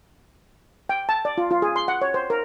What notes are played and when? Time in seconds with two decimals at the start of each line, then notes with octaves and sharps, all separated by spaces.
0.89 G5
1.09 A5
1.25 D5
1.38 F4
1.51 F4
1.62 G#4
1.76 C6
1.88 F#5
2.02 C#5
2.14 C5
2.30 A#4